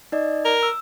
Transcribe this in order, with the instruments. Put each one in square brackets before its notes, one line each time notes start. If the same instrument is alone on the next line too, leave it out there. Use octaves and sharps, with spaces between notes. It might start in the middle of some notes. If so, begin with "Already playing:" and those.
[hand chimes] D#4 D5 D#5
[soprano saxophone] A#4
[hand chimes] E6